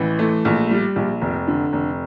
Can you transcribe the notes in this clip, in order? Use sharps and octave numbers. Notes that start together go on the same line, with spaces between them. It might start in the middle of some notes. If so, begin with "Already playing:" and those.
Already playing: A1 E3
A3
A#1
G3
A#1
F1
D3
F1